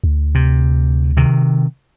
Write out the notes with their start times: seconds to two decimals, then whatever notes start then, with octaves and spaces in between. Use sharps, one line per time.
0.04 D2
0.35 C3
1.17 C3 D#3